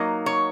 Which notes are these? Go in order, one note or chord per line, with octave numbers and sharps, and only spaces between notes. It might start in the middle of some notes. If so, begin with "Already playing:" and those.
Already playing: F#3 A#3 D#4
C#5